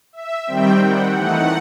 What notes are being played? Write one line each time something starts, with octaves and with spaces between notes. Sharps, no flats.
E5
D#3 G3 C4 G5
F#5
E3 A3 D#4 F#5